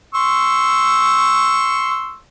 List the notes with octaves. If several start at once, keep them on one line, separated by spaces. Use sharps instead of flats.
C6 C#6 E6